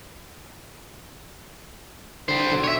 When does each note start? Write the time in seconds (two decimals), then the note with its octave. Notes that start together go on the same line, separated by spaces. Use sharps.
2.29 D3 G3 C5
2.50 B1 D3 F#3
2.64 C#5 E5